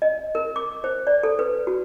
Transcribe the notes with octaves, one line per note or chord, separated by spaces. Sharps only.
D#5
A#4
D6
C5
D5
A4
B4
F#4